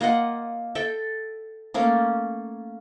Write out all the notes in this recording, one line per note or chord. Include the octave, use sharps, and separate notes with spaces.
A#3 F4 D#5 F#5
A4 E5 G5
A3 A#3 C#4